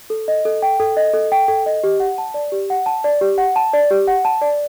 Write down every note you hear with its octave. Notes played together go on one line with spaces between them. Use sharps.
A4
D#5
A4
G5
A4
D#5
A4
G5
A4
D#5
G4
F#5
A5
D5
G4
F#5
A5
D5
G4
F#5
A5
D5
G4
F#5
A5
D5